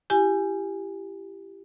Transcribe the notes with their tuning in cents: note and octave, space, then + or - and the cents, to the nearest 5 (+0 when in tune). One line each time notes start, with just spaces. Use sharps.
E4 +35 G4 +0 G#5 +0